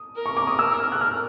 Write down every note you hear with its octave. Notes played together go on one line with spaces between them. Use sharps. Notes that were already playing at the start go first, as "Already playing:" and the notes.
Already playing: D#6
A#4
C#6
D6
D#6
E6
F6
F#6
F6